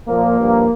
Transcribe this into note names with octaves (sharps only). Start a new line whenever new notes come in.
A#2 F3 A#3
G2 F3